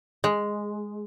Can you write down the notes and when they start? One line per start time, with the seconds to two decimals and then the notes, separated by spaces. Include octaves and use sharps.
0.24 G#3